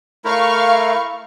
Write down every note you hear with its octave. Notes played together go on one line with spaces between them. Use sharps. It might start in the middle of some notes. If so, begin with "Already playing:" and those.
A3 E4 A#4 F5 C#6